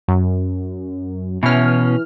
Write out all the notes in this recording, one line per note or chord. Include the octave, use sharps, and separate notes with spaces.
F#2
B2 E3 C#4 F6